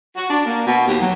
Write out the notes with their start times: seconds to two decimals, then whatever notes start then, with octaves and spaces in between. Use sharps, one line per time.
0.17 F#4
0.30 D4
0.45 A#3
0.66 B2
0.87 D#2
1.00 F#3